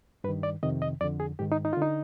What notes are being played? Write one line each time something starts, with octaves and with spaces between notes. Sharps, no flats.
G2 D#3 B4
D5
F2 C3 D#3 D#5
D#5
F2 D3 D5
G#4
G#2 D#3 G4
D#4
D#4
F4
D3 D#4